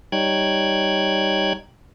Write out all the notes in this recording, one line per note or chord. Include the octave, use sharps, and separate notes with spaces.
G3 D#4 C#5 G5 F#6 G#6